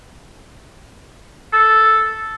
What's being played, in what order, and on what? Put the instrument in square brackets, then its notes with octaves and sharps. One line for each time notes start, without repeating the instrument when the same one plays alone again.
[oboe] A4